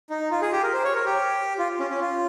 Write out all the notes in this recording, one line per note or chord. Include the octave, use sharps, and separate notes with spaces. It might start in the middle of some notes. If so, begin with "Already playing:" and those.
D#4
F4
G#4
G4
A#4
C5
C#5
A#4
G4
F4
C#4
C#4
F4